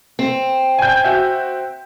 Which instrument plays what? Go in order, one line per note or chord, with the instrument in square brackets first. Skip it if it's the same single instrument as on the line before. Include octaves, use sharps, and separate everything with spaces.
[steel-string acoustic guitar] C4
[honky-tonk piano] G#5 G6
F#4 E5